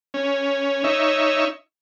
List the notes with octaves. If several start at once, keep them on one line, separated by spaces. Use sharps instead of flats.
C#4
D#4 C#5 E5